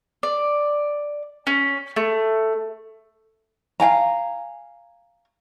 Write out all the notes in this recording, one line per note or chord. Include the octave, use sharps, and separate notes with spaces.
D5
C#4
A3
F5 G5 G#5 A#5